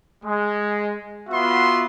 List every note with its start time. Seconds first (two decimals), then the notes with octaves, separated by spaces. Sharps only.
0.24 G#3
1.28 B3 F4 F#4 E5 C6